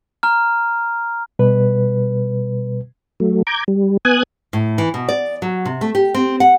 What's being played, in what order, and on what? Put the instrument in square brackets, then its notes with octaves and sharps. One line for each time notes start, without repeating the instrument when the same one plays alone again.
[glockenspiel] A#5 F6
[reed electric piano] B2 G3 B4
[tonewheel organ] F#3 A3
A#5 D6 G6 G#6
G3
B3 G#5 D#6 F#6 G#6
[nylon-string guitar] A2
E3
B2
D5
F#3
C3
A3
G4
C4
F#5